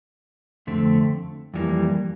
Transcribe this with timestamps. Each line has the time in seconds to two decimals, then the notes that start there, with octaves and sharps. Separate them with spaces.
0.67 F2 D3 A3 C4
1.54 F2 E3 G3 A#3